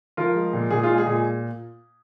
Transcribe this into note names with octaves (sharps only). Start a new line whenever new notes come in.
F3 F4 A#4
G#3
A#2
A#2 G#4
G#3 F4
G#4
A#2